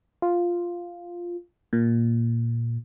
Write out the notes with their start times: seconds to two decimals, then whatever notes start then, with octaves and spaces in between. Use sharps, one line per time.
0.22 F4
1.73 A#2